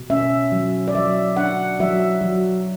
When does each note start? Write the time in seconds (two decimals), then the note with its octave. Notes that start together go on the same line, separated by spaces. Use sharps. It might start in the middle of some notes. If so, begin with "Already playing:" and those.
Already playing: B2
0.10 C#4 E5
0.52 F#3
0.88 D5
0.95 F#3 E5
1.37 D4 F#5
1.80 F#3 E5
2.21 F#3